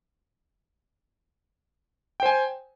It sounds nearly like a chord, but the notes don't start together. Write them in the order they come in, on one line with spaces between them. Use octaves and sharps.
G5 C5 G#5